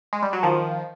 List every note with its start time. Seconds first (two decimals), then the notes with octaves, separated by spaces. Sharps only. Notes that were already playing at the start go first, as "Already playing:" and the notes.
0.13 G#3
0.23 G3
0.33 F#3
0.43 D#3 F3